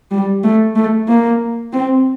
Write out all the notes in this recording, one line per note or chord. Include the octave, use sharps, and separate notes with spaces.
G3
A3
A3
A#3
C4